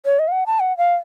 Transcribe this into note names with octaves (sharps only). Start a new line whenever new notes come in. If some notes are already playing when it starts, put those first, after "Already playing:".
C#5
D#5
F5
F#5
A5
F#5
F5